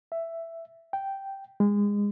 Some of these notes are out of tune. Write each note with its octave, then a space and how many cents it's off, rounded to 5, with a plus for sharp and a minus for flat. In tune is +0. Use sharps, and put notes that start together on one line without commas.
E5 +10
G5 -5
G#3 -25